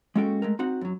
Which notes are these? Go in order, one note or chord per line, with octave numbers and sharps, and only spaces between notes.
G#3 A#3 C#4 F#4 A4 G5
G#3 A3 A#4
C4 D#4 F#4 F#5
F#2 F#3